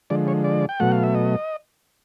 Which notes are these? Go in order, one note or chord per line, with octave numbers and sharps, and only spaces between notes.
D3 F3 G#3 D5
C#5
D5
G5
B2 F#3 A3 F#5
F5
E5
D#5